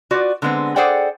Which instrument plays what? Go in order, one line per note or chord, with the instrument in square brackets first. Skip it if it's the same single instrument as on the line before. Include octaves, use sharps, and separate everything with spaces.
[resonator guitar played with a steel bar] F4 F#4 B4 D5
D3 G#3 A3 B3 C4
G#4 A4 C5 D5 F#5 G5